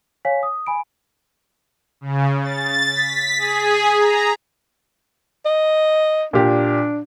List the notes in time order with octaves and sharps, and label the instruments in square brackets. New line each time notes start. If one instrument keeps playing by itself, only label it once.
[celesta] C#5 F5 G#5 B6
D#6
G#5 B5 D7
[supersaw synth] C#3
A6
B6
G#4
A#5
[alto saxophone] D#5
[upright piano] A#2 G4 [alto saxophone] D4